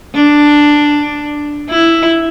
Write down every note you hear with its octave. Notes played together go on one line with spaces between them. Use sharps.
D4
E4